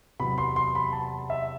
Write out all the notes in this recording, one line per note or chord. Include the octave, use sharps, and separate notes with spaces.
E2 C3 F#3 B5
C6
C6
B5
A5
E5